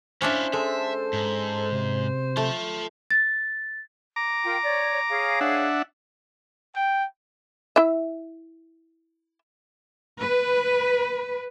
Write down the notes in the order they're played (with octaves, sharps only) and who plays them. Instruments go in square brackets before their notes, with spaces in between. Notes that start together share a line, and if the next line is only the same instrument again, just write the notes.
[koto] C#4 D4 E5 [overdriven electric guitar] E4 F5 [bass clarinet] C5
[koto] G#3 [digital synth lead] A4 [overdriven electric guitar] E5
[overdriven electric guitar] G#2
[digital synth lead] C3
[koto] A3 [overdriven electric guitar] F4 A5
[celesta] A6
[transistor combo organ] A#5 D6
[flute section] F4 A#4 G5
C#5 D5
G#4 C#5 F5
[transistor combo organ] D4 E5 F#5
[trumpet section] G5
[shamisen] E4 E5
[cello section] B4